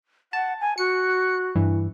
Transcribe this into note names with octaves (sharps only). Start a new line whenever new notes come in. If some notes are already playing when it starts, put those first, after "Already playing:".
F#5 A5
G#5
F#4 C#7
G2 E3